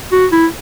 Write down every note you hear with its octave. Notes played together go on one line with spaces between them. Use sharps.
F#4
E4